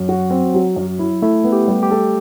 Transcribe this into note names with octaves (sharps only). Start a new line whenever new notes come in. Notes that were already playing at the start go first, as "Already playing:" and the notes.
Already playing: F#2 F#3
F#4
C4
F#3
F#2
E4
A3 E4
B3
G4
G3
G4
A4